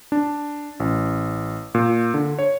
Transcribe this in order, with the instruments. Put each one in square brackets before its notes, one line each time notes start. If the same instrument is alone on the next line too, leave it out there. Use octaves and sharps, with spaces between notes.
[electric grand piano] D4
A1
A#2
D3
C#5